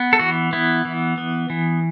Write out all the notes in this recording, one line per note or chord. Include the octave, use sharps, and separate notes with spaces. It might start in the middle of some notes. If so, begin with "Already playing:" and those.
Already playing: B3
A4
E3 F#4
B3 E4
E3
B3
E3